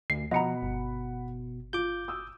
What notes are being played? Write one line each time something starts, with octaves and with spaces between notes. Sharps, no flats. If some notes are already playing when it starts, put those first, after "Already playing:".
D2 C7
B2 F3 D#5 F#5 A#5 B5 C#7
G1
F4 D6 G6
D#6 E6